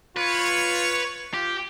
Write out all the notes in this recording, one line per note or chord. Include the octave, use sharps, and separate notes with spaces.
F4 B4 C#5
F4 G4